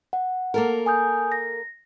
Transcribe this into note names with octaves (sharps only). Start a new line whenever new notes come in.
F#5
A#3 A4 A#4
G#5 D#6 G6
A#6